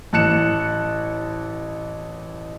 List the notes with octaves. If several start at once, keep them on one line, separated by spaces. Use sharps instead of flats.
A1 A5 F#6 C#7 E7